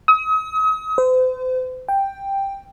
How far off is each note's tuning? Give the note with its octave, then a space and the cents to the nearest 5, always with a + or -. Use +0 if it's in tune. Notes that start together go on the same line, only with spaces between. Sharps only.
D#6 +40
C5 -40
G5 +5